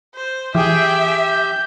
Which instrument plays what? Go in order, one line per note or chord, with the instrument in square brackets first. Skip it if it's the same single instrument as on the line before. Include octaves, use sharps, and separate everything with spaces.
[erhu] C5
[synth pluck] E3 [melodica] G4 [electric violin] G#4 G5 [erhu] E5
[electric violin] G6